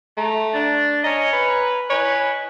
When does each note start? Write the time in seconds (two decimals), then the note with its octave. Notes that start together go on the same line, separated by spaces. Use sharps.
0.17 A3 A#5
0.53 D4 A6
1.04 C#4 C#5 D#5 A#5
1.33 B4
1.90 E4 B4 C#5 D#5 G#5